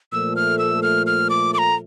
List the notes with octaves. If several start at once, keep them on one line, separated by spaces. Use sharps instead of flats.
A#2 F3 A3 E6
F6
E6
F6
F6
D6
D6
A#5